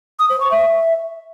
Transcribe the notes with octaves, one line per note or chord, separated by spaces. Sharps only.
D#6
C5
C#6
E5